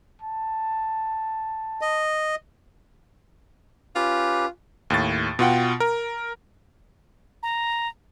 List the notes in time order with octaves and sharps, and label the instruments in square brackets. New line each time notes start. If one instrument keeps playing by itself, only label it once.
[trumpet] A5
[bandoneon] D#5
[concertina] C#4 G4 B4 [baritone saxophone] F4
[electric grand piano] D#2 A2 A6
B2 F4 F#5 G5
A#4
[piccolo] A#5